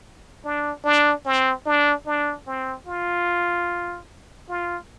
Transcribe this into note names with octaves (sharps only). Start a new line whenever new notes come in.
D4
D4
C4
D4
D4
C4
F4
F4